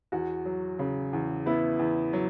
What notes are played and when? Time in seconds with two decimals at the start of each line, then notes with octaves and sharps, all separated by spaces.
0.12 E2 F#4
0.45 F#3
0.79 C#3
1.13 E2
1.46 B3 E4
1.79 E2
2.13 F#3